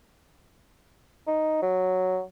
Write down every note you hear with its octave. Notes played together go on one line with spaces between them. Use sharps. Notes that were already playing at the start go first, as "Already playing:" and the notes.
D#4
F#3